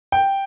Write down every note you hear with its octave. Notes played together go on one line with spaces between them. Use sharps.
G5